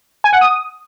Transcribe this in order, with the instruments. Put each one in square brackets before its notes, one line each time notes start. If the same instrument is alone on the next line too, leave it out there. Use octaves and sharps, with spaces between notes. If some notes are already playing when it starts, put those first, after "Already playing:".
[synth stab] G#5
F#5
D#6